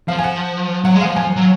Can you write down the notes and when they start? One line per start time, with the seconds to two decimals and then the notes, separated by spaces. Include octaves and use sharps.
0.08 F3 F5
0.19 G#5
0.24 F#5
0.84 F#3 F#5
0.95 G#3
1.01 F3 F5
1.16 F3 G#5
1.36 F#3